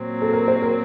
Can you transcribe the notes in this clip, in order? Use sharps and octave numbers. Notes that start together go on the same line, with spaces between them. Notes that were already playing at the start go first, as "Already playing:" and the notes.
Already playing: A#2 F#3 C4
A4
A#4
C5
A#4